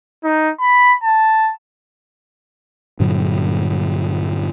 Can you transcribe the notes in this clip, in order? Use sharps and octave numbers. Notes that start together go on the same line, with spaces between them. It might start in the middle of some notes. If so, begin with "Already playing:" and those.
D#4
B5
A5
G2 A#2 D3 F#3